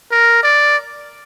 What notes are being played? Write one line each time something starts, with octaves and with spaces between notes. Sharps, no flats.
A#4
D5